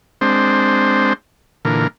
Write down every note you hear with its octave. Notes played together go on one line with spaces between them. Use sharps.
G#3 C4 D4 C5
A#2 D3 E3 A#4